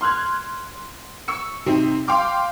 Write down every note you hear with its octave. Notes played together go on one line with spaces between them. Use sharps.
C6 F6 F#6 G#6
C#6 E6 C#7
C3 C4 D#4
F5 G5 C6 D6 F6